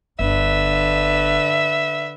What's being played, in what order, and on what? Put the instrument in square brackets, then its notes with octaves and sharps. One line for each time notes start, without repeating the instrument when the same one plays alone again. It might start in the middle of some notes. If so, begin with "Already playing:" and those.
[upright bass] G1 [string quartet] D3 B4 [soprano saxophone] E5